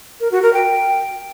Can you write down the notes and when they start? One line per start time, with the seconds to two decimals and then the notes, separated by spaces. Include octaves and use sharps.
0.20 A#4
0.31 F#4
0.42 A#4
0.53 G5